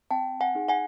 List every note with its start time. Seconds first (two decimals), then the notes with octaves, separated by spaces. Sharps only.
0.11 C4 G5 A5
0.41 F#5 G#5
0.55 D#4 G#4
0.69 F#5 G#5